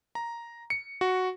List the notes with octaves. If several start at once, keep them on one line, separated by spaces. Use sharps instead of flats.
A#5
C#7
F#4